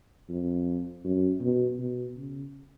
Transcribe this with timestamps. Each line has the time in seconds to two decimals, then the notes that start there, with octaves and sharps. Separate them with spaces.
0.29 F2
1.04 F#2
1.41 B2
1.79 B2
2.16 C#3